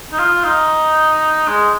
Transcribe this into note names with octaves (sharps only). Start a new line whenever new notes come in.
D#4
F4
D#4
G#3